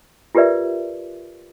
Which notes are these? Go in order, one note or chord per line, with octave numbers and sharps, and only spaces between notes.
F4 G4 A#4 B4 D5 E5